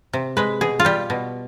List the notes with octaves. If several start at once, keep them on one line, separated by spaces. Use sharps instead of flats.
C3
G#3 B4
B2 G#4
F4
G3 G4
B2